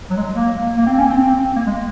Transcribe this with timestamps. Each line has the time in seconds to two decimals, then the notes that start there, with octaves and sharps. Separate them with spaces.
0.10 F#3
0.17 G#3
0.35 A#3
0.77 A#3
0.86 C4
0.98 C#4
1.10 C4
1.22 C4
1.56 A#3
1.67 G#3